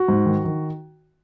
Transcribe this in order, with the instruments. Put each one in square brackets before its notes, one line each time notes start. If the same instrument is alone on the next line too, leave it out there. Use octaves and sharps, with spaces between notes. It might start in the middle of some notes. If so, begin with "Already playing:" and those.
Already playing: [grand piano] F#4
G#2
D#3
D#3